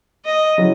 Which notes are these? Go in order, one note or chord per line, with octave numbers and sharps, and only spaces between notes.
D#5
C#3 F#3 C#4 E4